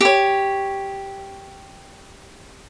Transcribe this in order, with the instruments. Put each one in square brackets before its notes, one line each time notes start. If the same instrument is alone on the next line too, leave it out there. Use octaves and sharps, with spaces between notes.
[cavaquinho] G4 C#5